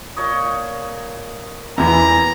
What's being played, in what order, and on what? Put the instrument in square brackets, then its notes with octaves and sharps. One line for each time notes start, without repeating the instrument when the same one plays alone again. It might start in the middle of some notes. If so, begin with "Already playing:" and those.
[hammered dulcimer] A#2 C#5 D#5
[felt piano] E2 E3 [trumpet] A#5